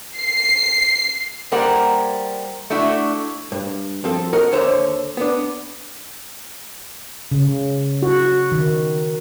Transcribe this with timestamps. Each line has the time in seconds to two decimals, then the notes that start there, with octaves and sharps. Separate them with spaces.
0.18 C7
1.52 G3 A#3 A#4 C5 F#5
2.70 A3 D4 E4 F#4
3.52 G2
4.04 F3 C4 A4
4.33 F#4 A#4 D#5 F#5
4.52 D#2 D3 C5 C#5 E5
5.17 B3 D4
7.31 C#3
8.02 F#4
8.52 D#3